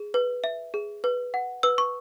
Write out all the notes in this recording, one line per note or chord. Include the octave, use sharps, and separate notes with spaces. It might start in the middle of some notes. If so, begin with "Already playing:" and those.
Already playing: G#4
B4
E5
G#4
B4
F#5
B4 E6
C#6